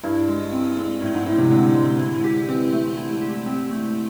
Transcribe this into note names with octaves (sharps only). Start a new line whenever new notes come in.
G2 E4
G#3
C4
G#3
A2 E4
G#2
A2 G#3
C3
D3 C4
G#3
E4
G4
E3 C4
A3
E4
G4
C4
A3